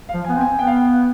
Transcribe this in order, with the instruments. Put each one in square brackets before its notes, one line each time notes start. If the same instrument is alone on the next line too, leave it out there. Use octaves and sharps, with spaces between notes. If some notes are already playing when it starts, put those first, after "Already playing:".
[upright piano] F5
[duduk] F3
[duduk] B3 [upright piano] G#5
[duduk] C4
[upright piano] G#5
[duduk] B3 [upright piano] G5
[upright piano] F5
G5